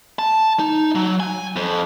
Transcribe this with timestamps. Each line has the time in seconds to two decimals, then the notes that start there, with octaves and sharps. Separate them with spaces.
0.19 A5
0.59 D#4
0.95 F#3
1.20 G#5
1.56 F2